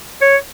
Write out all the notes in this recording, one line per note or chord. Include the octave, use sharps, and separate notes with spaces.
C#5